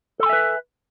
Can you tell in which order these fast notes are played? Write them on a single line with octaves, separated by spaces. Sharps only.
A4 C6 G#5 E5 B4